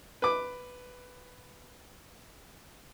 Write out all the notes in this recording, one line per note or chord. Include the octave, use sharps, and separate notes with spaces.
B4 D6